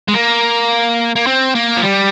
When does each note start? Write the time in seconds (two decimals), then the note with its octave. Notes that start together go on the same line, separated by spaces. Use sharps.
0.08 G#3
0.14 A#3
1.16 A#3
1.27 C4
1.55 A#3
1.76 F3
1.83 G3